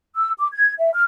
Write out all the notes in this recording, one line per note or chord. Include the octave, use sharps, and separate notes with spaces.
E6
D6
G#6
E5
F6